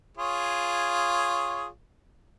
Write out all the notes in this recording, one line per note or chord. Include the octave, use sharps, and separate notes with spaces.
F4 G#4 C#5